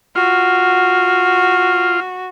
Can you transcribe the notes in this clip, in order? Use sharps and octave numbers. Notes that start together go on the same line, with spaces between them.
F4 F#4